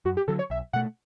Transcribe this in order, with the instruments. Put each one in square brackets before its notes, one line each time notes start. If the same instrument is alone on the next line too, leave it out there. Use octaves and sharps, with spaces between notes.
[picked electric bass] F#2 [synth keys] F#4
[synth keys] G4
[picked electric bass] D3 F#3 [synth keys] A4
[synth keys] C#5
[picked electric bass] B1 [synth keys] E5
[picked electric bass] B2 A3 [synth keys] F#5